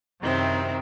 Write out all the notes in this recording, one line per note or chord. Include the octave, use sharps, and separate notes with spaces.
F#2 C3 D#3 C4 E4